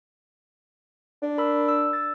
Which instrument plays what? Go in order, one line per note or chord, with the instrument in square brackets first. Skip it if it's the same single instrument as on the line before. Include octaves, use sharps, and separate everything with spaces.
[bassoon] D4
[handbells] A#4 B5 E6
E6
E6 A6